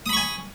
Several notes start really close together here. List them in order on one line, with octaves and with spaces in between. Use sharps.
D#6 B5 C#6 G#5